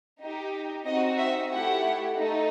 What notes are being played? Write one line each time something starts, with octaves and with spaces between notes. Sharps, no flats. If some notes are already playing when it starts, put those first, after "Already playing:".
D#4 G4
C4 D#4 F#4 D#5
E5
A3 E4 G4 F#5
A3 D#4 A4